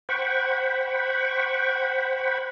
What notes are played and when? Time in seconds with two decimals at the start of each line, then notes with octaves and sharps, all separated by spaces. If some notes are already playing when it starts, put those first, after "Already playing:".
0.09 C5 F#5 G5 B5 C#6